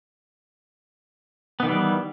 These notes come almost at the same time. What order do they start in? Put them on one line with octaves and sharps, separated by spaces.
B3 D#3 E3 G3